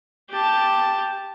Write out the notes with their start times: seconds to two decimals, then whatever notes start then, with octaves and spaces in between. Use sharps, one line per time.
0.30 G4 A5